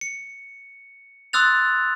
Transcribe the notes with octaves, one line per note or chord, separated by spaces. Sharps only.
C#7
C6 D#6 E6 F#6 A6 F7